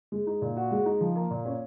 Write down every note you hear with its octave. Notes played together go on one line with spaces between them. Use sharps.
G#3
D#4
A#2
F#4
G#3
D#4
F3
A#3
A#2
C#4